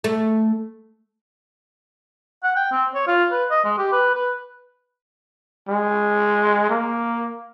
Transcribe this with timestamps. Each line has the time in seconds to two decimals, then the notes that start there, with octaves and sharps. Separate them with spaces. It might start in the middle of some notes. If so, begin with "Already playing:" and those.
0.04 A3
2.44 F#5
2.56 G5
2.71 C4
2.95 C#5
3.07 F4
3.32 B4
3.50 D#5
3.65 G#3
3.78 G4
3.92 B4
4.15 B4
5.69 G#3
6.70 A#3